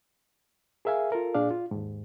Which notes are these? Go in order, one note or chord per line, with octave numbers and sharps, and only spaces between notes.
G#4 A#4 E5 F5 G#5
F4 A4 A#4
A#2 D4 G#4 D5 F5
F4
D#2 G#2